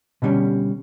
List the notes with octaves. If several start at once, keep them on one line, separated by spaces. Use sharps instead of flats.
B2 D3 G3 C#4